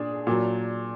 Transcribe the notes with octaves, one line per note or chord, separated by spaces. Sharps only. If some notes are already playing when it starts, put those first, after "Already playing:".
Already playing: A#2 D4 G#4
A#2 F#3